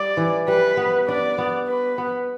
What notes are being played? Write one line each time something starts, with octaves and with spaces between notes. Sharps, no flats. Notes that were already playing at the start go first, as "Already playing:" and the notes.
Already playing: G3 D5
E3
G3 B4
B3
D4 D5
B3
B4
B3